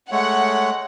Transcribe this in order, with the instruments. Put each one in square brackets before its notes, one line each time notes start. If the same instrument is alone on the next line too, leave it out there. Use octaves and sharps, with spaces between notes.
[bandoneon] G#3 A3 C#5 [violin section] F#5